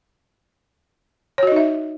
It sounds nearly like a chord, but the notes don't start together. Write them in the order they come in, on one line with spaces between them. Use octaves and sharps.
C#5 F#4 D#5 D#4 E5